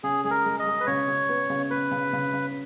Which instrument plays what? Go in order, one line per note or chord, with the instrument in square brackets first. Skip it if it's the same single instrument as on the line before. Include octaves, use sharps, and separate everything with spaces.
[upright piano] C#3 [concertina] G#4
[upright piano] G#3 [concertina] G#4
[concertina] A#4
[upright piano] G#3
[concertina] D#5
[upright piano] G#3
[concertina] B4
[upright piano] C#3 [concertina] C#5
[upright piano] C#3
B3
C#3
[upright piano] B3 [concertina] B4
[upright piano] C#3
C#3
C#3